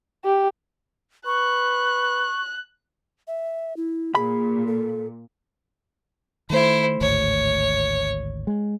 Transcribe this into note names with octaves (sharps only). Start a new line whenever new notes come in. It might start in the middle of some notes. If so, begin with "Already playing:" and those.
G4
B4 C#6 F#6
E5
E4
A#2 G#4 B5
A4
D#3 A3 E4 C5
G#1 D2 A2 C#5
G#3